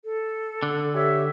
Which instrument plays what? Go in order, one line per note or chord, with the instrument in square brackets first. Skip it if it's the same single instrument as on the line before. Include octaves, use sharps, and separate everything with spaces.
[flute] A4
[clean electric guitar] D3
[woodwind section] G4 C#5 E5